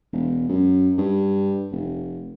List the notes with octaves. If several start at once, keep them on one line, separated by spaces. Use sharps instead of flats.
E1
F#2
G2
F1